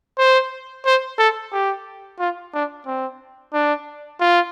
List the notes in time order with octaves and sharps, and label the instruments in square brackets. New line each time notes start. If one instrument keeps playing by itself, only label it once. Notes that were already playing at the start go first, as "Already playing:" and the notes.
[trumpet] C5
C5
A4
G4
F4
D4
C4
D4
F4